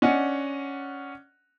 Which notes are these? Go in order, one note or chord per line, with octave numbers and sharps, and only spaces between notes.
C#4 D4 D#5 F#5